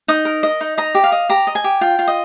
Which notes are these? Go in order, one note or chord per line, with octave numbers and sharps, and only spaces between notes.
D#4 D#6
A#4
D#5
D#4
D#5 A#5
G4
F5
D#5
G4 A#5
D#5
G#5
G4
F4 G5
F4
D#5